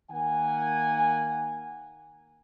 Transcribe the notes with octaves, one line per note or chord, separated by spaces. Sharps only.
D#3 A#3 F#5 G#5